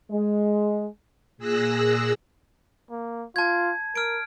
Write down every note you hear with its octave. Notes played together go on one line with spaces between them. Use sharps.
G#3
A#2 G#4 E6 F#6 A#6
A#3
F4 A5 G#6
A#4 F6 D7